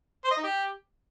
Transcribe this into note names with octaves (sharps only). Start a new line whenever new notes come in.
C5
D#5
D#4
G4